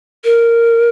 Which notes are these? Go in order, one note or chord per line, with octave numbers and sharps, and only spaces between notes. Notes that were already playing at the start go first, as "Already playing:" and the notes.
A#4